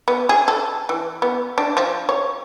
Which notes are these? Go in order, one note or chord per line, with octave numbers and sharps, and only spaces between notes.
B3
G#4
A4
E3
B3
D4
F3
C#5